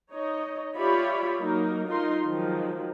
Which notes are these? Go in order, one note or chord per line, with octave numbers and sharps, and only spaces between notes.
D#4 C#5 D#5
F4 G4 C#5 D5 E5 B5
F#3 A#3 D#4 A#4
D#4 F4 A#4 C6
D#3 F3 F#3 G#3